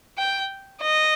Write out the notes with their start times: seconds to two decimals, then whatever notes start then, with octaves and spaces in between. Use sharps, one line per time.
0.18 G5
0.82 D#5